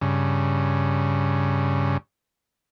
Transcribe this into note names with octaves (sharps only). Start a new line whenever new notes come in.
G2 C#3